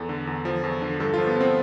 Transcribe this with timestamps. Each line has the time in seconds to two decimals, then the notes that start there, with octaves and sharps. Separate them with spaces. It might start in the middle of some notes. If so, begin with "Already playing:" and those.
Already playing: E2 A4
0.09 D3
0.27 E2
0.45 F3
0.64 E2
0.82 D3
1.00 G2 A4
1.14 F3 F4
1.27 B3
1.36 F3 C4